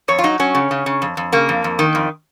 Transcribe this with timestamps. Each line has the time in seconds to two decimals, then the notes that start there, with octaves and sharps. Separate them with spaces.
0.08 F2 C#5
0.19 F4
0.24 F#3 D#4
0.39 F#3 C#4
0.55 C#3
0.71 C#3
0.86 C#3
1.02 F2
1.17 F2
1.32 C#3 A#3
1.49 F2
1.64 F2
1.79 D#3
1.95 F2